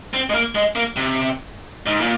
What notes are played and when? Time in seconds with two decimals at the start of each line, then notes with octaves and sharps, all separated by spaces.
0.13 C4
0.30 G#3
0.34 A#3
0.55 G#3
0.75 A#3
0.96 C3
1.86 G#2
2.01 A#2